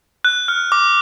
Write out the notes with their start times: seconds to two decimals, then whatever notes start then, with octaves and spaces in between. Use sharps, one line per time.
0.25 F#6
0.48 F6
0.72 D6